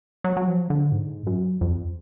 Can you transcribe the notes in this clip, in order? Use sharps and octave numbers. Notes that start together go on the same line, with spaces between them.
F#3
F#3
F3
D3
G#2
F#2
F2